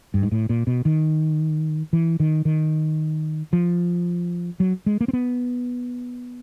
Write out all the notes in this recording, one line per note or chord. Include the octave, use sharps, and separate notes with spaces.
G2
G#2
A2
A#2
B2
D#3
E3
D#3
D#3
F3
F#3
G#3
A#3
C4
B3